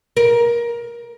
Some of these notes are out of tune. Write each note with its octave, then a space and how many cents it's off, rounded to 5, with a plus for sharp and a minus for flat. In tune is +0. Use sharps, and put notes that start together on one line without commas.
A#4 +20